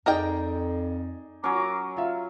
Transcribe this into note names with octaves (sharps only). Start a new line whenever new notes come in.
F2 D#4 G#4 A#4 D5 D#5 G5
F#3 C#4 A#5 D6
F4 E5 F5